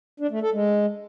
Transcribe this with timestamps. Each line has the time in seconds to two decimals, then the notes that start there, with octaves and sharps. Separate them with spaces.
0.20 D4
0.31 A3
0.42 A4
0.53 G#3